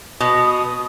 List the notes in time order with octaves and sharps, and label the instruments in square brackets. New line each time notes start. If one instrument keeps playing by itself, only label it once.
[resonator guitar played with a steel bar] B2
[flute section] D#6